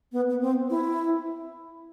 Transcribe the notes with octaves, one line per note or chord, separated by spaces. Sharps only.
B3
B3
C4
E4